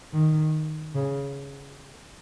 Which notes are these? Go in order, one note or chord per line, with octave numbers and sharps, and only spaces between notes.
D#3
C#3